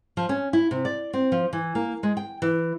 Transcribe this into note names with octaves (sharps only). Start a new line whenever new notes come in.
F3
C#4
E4
C3
D5
C4
F3
E3
A#3
G#3
G5
E3